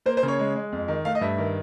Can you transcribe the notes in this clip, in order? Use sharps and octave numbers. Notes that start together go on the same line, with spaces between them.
A#3 C5
C5
C#3
C#5
G#3
G#3
F2
D#3
A3 F5
D#5
G2 E5
D#3